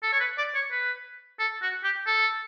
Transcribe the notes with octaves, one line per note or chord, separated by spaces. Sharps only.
A4
C#5
B4
D5
C#5
B4
A4
F#4
G4
A4